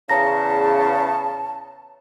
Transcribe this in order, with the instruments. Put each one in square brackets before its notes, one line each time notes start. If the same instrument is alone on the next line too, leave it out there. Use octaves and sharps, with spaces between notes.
[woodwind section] E2 C#3 [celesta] C#5 A#5 A#6 [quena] A5